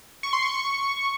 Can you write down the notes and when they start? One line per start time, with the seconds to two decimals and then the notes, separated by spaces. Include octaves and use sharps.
0.23 C#6
0.33 C6
0.43 C#6